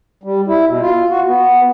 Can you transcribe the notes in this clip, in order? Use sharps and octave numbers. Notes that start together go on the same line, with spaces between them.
G3
E4
B2
F4
F#4
B3